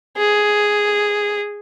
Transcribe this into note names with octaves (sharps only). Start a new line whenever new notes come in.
G#4